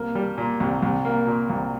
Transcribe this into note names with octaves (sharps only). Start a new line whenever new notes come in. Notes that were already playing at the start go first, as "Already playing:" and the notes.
Already playing: C2 A#3
G3
A#2
C2
C2
A#3
A#2
C2